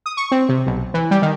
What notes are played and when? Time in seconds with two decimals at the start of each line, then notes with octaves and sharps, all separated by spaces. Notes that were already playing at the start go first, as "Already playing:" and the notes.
0.06 D#6
0.17 C#6
0.31 C4
0.49 C3
0.67 B1
0.94 E3
1.11 G3
1.22 D#3